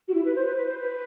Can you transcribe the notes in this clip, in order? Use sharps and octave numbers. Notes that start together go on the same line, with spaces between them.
F#4
E4
B4
C5
B4
B4
C5
B4